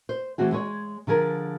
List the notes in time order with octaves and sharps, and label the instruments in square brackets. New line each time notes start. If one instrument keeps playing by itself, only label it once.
[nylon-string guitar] C5
E3 A3 C4 F#4 G#4
G#3 G#4 C#5
D3 F3 G#4 A#4